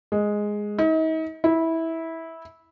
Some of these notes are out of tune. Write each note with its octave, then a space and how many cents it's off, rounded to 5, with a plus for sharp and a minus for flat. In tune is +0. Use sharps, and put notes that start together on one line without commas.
G#3 +0
D#4 +40
E4 -15